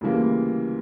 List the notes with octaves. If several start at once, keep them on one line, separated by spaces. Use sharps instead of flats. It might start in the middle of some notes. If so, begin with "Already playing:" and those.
D2 C#3 E3 G3 A#3